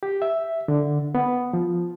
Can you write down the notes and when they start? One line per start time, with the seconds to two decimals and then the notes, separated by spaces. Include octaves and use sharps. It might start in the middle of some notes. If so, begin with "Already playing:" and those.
0.03 G4
0.22 E5
0.68 D3
1.15 B3
1.53 F3